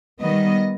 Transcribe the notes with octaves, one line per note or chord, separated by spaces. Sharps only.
D#3 G3 B3 D#5